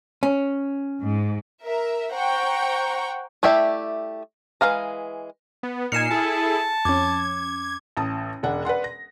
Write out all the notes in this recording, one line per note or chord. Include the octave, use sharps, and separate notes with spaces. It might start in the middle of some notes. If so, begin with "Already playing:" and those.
C#4
G#2
A#4 E5
C5 F#5 G5 A#5 C#6
A3 E4 G4 D5 E5
E3 F#3 G#3 F5 A#5
B3
A#2 D#4 G#5 F6 C7 C#7 E7
E4 G#4 A4 A5
F2 C#4 D6 G#6
A1 A5 D#6
E1 D4 F#5
B4 D5 F#5 C6
A#6